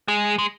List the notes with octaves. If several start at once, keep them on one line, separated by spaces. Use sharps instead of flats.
G#3
G#3